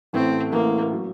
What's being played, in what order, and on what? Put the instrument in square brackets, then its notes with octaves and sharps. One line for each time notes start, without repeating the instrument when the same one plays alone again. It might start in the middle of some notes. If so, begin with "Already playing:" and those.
[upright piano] A1 A2 A3 [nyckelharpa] C4
[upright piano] A1 A2 A3 [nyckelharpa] A#3
[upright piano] F#3